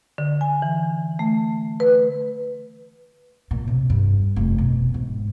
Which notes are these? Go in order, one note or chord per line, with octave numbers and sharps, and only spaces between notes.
D3
G#5
E3
A3
B4
A#2
C3
G2
F1
B2
G#2